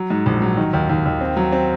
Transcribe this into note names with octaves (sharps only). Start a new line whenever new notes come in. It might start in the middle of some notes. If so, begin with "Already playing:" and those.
Already playing: F#3
G#2
A#1
F#3
D#3
D#2
D#2
D#2
C4
F#3
C4